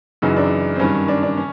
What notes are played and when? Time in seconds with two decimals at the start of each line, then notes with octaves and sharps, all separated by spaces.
0.22 F#2 C#3 E3 D#4
0.37 D4
0.75 C4
0.80 G2 D#3 C#4
1.08 D4
1.23 D4
1.37 C#4